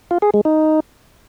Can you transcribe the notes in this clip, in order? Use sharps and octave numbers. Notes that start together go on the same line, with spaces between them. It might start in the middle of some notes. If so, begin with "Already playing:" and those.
F4
G#4
G#3
D#4